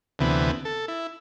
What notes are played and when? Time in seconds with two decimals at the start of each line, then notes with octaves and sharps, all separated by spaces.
0.19 D2 C3 E3 B3
0.65 A4
0.88 E4